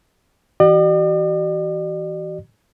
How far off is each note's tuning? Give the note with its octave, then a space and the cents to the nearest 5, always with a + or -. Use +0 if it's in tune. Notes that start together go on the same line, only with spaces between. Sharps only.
E3 +0 F#4 +45 D5 +45